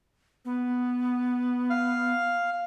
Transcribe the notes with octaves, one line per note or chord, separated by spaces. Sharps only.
B3
F5